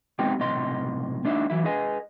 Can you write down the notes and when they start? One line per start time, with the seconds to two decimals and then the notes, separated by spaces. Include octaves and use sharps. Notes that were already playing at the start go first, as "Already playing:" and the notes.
0.19 G#3 B3 C4 D#4 G4 G5
0.39 B1 A2 C3 D#5 C6
1.25 A3 D4 D#4 E5
1.50 E3 F#3 E4
1.65 G#4 B4 D#5 G#5